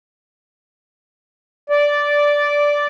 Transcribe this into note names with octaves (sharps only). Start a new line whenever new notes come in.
D5